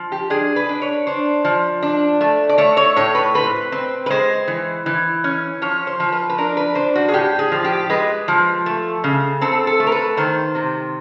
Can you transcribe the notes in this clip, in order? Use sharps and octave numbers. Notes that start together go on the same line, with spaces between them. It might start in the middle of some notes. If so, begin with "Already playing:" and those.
Already playing: F3
G4
D4 G#4
B4
D4
C#5
D4 C5
F3
D4
A3
D5
A3 C#5
C#5
A2 C#5
B4
C4 B4
C4
B4
G#3 C5
E3
E3
C#4
F3 C#5
C5
F3
B4
B4
D4 A#4
B4
D4 C5
F#4
G#4
A2 G4
G#4
F3
G4
G#3 B4
F3
A3
C#3
C4 A4
A4
A3
A#4
B4
D#3 C5
C3